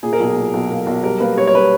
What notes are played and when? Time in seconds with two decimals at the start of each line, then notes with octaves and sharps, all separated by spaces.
0.03 A#2 G#4
0.13 A#4
0.20 B1 G#4
0.36 A#2
0.53 B1
0.70 A#3
0.86 B1
1.04 G3 A#4
1.20 A#3 B4
1.37 G3 C#5
1.47 C#5
1.54 G3 B4